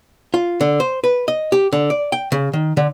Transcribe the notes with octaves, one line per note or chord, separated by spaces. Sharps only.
F4
D3
C5
B4
D#5
G4
D3
D5
G5
C#3
D#3
D3